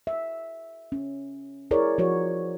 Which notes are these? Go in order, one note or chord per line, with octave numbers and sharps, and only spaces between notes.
E5
C#4
E4 G#4 A#4 C#5 D5
F3 F#4 C#5